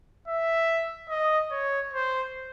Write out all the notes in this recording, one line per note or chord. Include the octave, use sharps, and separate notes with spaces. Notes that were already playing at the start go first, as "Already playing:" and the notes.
E5
D#5
C#5
C5